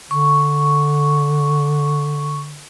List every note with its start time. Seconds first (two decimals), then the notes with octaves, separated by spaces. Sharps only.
0.11 D3 C#6